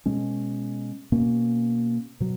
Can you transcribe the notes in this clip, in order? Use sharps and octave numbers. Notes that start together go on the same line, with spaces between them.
B2 G#3 C#4
B2 A#3 C#4
B2 F#3